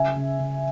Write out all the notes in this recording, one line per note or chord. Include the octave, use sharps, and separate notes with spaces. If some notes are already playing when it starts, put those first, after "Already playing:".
Already playing: C#3 E5 G#5
C#3
C#3